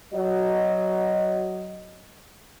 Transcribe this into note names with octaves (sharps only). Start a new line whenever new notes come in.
F#3 D#5